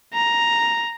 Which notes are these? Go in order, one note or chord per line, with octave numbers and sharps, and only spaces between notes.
A#5